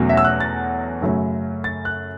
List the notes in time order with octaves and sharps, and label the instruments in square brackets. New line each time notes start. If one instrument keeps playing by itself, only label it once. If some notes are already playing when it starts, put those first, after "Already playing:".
Already playing: [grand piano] E2 B2 F#3 A3 C#4
E5
E6
F#6
A6
F#2 C#3 F#3 A3 C#4
A6
F#6